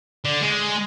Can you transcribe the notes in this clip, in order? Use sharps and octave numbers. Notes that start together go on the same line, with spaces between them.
D3
G#3